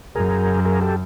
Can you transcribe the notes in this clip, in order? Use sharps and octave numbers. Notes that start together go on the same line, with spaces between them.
F#2 G#4 A#4
G#4 A#4
G4 A4